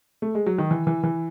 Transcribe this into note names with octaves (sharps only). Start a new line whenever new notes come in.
A3
G#3
F#3
D#3
E3
E3
E3